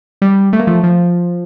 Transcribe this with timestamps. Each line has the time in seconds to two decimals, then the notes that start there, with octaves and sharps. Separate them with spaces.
0.22 G3
0.53 A3
0.59 A#3
0.67 F3 A3
0.83 F3